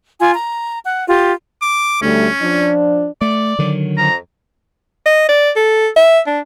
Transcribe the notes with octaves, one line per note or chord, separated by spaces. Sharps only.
F4 G#5
A#5
F#5
F4 G4
D6
D2 G3 A3 C#4
F3 D4
A3 D5
D3 D#3 F#3
F2 A#5
D#5
D5
A4
E5
D4